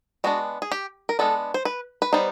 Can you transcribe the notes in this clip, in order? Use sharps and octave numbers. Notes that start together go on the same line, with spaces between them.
G#3 B3 D4 F#4
G#4
G4
A#4
G#3 B3 D4 A4
C5
B4
B4
G3 B3 D#4 C5